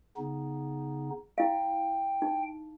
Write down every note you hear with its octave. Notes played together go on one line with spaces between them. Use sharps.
C#3 B3 D#4
E4 F5 G5
D#4